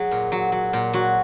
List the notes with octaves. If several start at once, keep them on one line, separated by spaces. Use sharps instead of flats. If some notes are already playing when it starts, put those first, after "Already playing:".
Already playing: F#3 G#4
A#2
F#3
F#3
A#2
F#3 F#4